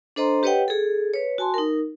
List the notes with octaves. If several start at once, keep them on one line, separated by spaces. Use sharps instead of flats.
D4 A4 C5 D#5 A#5 C6
G4 B4 C#5 D#5 F#5 G5
G#4 A4
B4 C#5
F#4 G#5 A5 C6
D#4 A#4